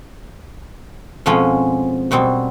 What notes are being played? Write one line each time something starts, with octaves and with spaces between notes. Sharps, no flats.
F2 B2 F3 G#3 C#4
F#2 B2 G3 C4